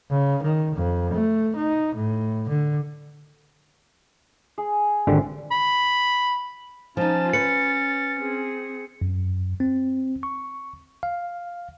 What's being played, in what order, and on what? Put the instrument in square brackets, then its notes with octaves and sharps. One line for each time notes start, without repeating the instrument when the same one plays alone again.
[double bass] C#3
D#3
F2
A3
D#4
A2
D3
[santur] G#4
[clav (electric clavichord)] G#1 D3 G4
[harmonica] B5
[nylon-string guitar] F3 D#4 [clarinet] C#4 [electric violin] F4 A5
[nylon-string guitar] B4 C#5 [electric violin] A6 [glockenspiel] C#7
[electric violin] C4 G#4
[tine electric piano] F#2
C4
C#6
F5